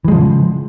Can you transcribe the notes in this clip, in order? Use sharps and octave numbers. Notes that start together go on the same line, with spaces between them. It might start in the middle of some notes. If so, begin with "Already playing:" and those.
C#3 E3 F3 G#3